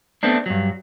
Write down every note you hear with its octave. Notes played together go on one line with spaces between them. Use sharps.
A3 B3 C4 D4
G2 F#3